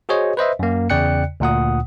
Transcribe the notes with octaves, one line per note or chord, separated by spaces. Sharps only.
F#4 G#4 C5 C#5 D#5
B4 C5 D#5 E5
F#2 A#3
E2 C#3 D5 G5 F#6 C#7
D2 A#2 F#5 D#6